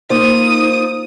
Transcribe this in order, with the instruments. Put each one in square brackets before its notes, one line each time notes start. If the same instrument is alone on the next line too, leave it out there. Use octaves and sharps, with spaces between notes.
[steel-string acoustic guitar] A#3 F4 [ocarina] D#4 [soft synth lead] C5 [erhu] D#6